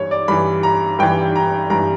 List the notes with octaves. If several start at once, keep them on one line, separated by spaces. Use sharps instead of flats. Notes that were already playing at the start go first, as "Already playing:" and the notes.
Already playing: G2 E3 C#5
D5
G2 E3 B5
A#5
G2 E3 G5
A#5
G2 E3 A#5